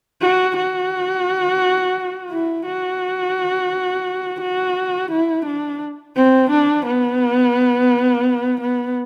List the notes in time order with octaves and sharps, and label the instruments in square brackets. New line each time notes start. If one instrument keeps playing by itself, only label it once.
[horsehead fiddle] F#4
F#4
E4
F#4
F#4
E4
D4
C4
D4
B3
B3